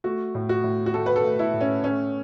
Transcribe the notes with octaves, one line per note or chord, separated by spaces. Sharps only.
A3 F#4
A2
F#4
A2
F#4
A3 A4
B4
A4
A3
E4
A2
C#4
A3 C#4